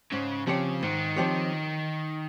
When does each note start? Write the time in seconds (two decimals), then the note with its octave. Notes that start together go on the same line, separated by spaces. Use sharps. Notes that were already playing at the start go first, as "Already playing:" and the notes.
0.12 G#2 C#3
0.47 C#3 F3 C4 G4 C#5
0.83 G#2 D#3
1.16 F3 C4 G4 C#5